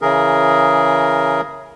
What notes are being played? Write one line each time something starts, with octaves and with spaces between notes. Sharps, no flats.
C#3 E3 G#4 A#4